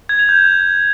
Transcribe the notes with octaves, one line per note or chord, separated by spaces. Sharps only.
G#6
F7
G6